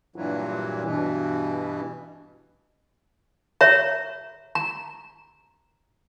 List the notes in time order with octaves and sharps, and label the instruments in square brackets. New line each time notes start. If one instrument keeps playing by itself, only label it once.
[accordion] G2 A#2 E3 F#3
G2 B2 E3
[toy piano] C#5 E5 A#5
A#5